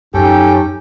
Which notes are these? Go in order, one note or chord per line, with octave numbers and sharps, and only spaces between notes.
F#2 C#4 D#4 G4 A4 G5